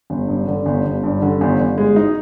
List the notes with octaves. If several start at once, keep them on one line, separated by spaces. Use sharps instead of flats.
G1
G2
D3
G1
G1
G2
D3
G1
G1
G#3
D#4